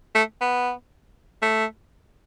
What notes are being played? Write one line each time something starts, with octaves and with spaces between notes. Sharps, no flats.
A3
B3
A3